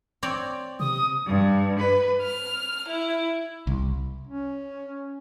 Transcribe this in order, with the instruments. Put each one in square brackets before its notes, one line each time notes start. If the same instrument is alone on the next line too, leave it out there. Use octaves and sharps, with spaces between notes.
[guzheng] C4 C#5 D5
[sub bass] C3 [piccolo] D#6
[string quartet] G2
B4
F6
E4
[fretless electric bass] C2
[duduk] C#4